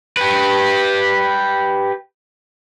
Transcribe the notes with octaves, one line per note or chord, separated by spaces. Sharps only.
G4 B4